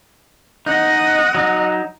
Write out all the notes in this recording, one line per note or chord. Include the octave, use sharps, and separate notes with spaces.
D#4 D#5 F#5
F#3 D#4